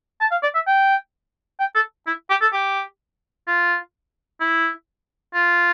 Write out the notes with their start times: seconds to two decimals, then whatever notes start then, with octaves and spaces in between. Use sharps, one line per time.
0.21 A5
0.31 F5
0.43 D5
0.55 E5
0.67 G5
1.60 G5
1.75 A4
2.07 E4
2.30 G4
2.42 A4
2.53 G4
3.47 F4
4.41 E4
5.34 F4